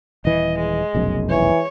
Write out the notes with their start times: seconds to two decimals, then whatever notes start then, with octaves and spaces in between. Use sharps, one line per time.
0.25 D#1 E3 D#5
0.59 G#3
0.95 F1 B1 F#2
1.30 E3 C#5